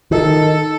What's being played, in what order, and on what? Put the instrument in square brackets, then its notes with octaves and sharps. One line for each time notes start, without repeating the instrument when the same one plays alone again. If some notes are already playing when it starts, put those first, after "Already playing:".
[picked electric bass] D#3 [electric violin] A4